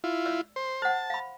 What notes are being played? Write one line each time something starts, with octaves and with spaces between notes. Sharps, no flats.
E4 F4
D5 E6
C5
C5 F#5 A5
F5 B5